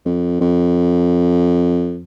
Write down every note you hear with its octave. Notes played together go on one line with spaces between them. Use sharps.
F2
F2